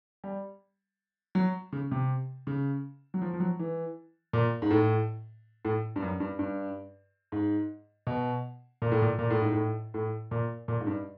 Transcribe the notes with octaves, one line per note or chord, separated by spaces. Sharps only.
G3
F#3
C#3
C3
C#3
F#3
F3
F3
F#3
E3
A#2
G#2
A2
A2
G2
F#2
G2
G2
G#2
B2
A#2
A2
A#2
A#2
A2
G#2
A2
A2
A#2
A#2
G#2
G2